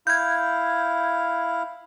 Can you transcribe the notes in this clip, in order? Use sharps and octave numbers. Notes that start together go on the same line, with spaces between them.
E4 F5 G6 G#6